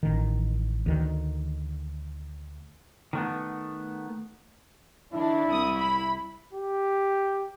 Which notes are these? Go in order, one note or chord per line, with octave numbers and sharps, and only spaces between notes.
A1 D#3
D2 D#3
D#3 A3 B3
D#3 D4 E4
C2 D#6
B5
G4